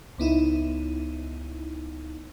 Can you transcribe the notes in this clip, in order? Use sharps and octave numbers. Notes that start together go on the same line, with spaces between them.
C#2 B3 D#4 E4